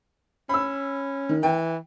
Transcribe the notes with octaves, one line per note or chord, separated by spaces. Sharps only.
C#4 B5 E6
D#3
E3 G5